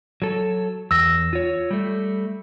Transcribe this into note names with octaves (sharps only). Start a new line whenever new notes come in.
F#3 A4
E2 E6 A#6
F4 C#5
G3 A3